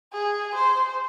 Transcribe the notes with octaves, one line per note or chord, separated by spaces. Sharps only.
G#4
C5